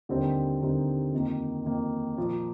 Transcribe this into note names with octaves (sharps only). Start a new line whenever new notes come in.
D#2 D3 G3 C4 D#4
D#2 D3 G3 C4 D#4
F2 D#3 A#3
F2 D#3 A#3
A#2 F3 A#3 F4